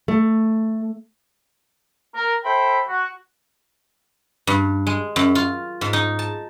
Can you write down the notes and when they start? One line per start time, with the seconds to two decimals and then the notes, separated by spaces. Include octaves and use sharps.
0.08 A3
2.14 A#4
2.44 A4 C5 E5 G5 B5
2.88 F#4
4.47 G2
4.87 G#3
5.16 F#2
5.35 F4
5.81 G#2
5.93 D#4
6.19 A5